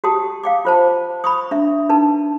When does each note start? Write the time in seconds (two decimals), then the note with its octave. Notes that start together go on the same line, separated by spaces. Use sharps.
0.04 F#4 G4 G5 A5 D#6
0.44 F5 G5 D6
0.65 F4 C5 A5
1.24 B5 C#6 D#6
1.51 D4 E5
1.89 D4 D#4 B4 A5